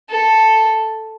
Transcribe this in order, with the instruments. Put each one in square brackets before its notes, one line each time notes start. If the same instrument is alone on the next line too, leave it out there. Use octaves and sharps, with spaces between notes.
[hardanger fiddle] A4